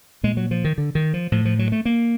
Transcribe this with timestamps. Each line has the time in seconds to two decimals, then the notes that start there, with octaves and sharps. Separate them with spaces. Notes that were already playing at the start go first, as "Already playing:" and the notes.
0.23 A#2 G#3
0.37 F#3
0.51 F3
0.64 D#3
0.78 D3
0.95 D#3
1.14 F3
1.32 A2 F3
1.45 F3
1.59 F#3
1.72 A3
1.85 A#3